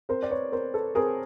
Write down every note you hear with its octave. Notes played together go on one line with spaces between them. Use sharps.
C4 A#4 C5
D5
B4 C#5
C4 A#4 C5
A4 B4
C4 G#4 A#4